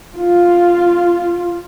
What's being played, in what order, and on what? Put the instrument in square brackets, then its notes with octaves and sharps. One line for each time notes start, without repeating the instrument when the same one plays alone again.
[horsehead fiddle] F4